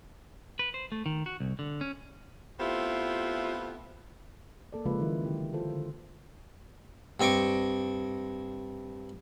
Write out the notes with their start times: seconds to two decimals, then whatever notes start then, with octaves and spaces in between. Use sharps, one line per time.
0.59 B4
0.74 C5
0.92 A3
1.06 D#3
1.26 F#4
1.40 C2
1.59 D3
1.81 C#4
2.60 A3 B3 C4 E4 F4 G4
4.73 A#3 A4 D5
4.85 C#3 F3 G#3 A#3 F4 B4
5.00 D#3 F#3 E4
5.24 D3 E4 G4
5.53 E4 F4 A4 C5
5.70 D3 C5
7.20 G2 C4 D#5 C#6 D6